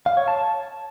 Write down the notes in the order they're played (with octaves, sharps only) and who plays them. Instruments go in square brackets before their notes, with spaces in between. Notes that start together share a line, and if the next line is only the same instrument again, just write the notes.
[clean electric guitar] F5
C#5
A5